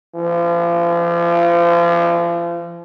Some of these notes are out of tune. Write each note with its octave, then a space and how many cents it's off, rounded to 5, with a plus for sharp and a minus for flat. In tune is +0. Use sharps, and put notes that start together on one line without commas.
F3 -35